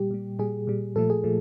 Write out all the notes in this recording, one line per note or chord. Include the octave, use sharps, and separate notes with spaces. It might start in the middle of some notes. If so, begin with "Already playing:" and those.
Already playing: A#2 G3 G4
A#2 G3
A#2 G3 G#4
A#2 G3
A#2 F3 A3 A4
G#4
A#2 F3 A3